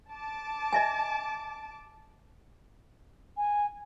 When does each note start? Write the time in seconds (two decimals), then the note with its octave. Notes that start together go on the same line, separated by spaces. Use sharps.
0.11 A5 D6
0.73 D#5 E5 G#5
3.37 G#5